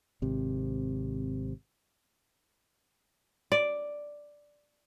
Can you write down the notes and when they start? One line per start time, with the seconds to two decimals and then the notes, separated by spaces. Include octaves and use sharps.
0.22 G#1 C3
3.52 D5